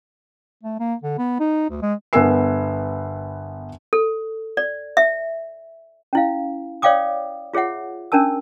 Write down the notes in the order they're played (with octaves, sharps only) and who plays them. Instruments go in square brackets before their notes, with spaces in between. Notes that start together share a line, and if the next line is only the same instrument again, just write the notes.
[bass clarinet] A3
A#3
D3
B3
D#4
D2
G#3
[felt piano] G1 B3 A#4 G#5 E6 C7
[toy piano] A4
D5
E5
C#4 E4 F5
C#5 D5 F5 G5 D6 D#6
F4 G#4 C#5 E5 F#5
C#4 D4 A#4 A5 E6